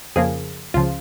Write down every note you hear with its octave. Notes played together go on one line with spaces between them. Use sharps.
F2 C#3 F3 A#3 G#4
C#2 C#3 F3 F4